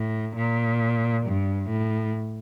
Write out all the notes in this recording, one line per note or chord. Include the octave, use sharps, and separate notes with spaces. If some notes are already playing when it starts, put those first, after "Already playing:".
Already playing: A2
A#2
G2
A2